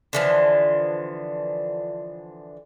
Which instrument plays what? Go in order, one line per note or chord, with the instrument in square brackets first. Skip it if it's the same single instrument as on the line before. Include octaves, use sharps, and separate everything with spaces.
[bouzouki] D3 E3 F3